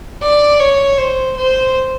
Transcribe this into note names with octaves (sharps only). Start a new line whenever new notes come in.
D5
C#5
C5
C5